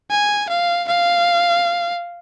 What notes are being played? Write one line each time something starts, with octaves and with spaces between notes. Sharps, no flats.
G#5
F5
F5